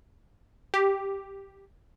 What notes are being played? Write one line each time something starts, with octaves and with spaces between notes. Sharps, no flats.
G4